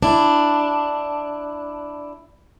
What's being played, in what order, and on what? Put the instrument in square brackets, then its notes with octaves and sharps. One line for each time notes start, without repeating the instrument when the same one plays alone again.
[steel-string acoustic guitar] D4 E4